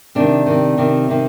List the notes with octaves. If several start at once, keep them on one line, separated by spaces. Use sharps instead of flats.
C3 D#3 D4
C3 D#3
C3 D#3
C3 D#3